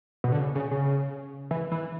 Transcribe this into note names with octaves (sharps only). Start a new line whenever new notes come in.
B2
D3
C#3
C#3
C#3
E3
E3